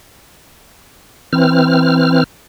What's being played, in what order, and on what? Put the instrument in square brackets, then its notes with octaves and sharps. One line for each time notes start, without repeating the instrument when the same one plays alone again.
[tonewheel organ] E3 C4 F6